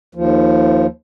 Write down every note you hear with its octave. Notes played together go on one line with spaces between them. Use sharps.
D#2 F3